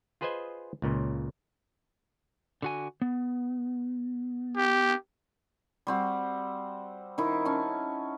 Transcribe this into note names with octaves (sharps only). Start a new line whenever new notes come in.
F4 G#4 B4 C5 D#5 G#5
C#2 A#2 C#3
D3 F#4 G#5
B3
G4
G3 C4 F#4
D#3 D#4 E4
C#4 A5